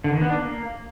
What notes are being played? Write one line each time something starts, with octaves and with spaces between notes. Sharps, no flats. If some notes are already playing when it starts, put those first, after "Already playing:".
D3
D#3
B3
D4
A#3